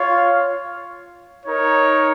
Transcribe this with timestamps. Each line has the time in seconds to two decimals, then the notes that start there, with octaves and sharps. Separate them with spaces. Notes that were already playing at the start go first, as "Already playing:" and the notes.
Already playing: F4 C#5 F5
1.45 D#4 A#4 C#5